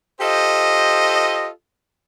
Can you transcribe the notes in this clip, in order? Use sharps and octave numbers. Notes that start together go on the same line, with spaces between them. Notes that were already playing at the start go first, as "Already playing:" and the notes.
F4 G4 A4 C5 D#5